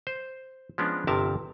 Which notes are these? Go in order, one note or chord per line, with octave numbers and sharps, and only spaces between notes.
C5
F3 G#3 B3 C#4 D4
G1 C3 F3 A#4 E5 A5